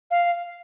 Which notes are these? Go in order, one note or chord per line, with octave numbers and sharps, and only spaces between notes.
F5